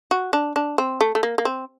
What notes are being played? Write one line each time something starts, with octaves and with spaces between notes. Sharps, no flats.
F#4
D4
D4
C4
A3
A3
A#3
A#3
C4